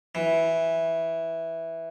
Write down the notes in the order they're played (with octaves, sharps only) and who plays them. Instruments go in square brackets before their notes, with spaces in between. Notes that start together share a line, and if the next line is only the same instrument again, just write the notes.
[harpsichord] E3